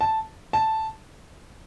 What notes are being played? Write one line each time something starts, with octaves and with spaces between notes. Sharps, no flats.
A5
A5